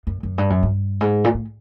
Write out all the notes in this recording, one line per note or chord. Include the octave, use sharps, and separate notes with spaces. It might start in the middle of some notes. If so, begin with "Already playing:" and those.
F#2
F#2
G2
F#2
G2
G#2
A#2
A2